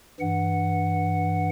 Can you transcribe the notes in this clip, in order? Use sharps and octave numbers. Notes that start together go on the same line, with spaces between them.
G2 E3 F#5